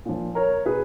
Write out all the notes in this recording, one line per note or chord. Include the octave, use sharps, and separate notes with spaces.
A#2 F3
A#4 C#5
B2 G#4 B4